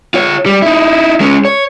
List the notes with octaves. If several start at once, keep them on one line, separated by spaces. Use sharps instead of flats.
F4 C#5
G3
D#4 E4
G#3 C#4
C#5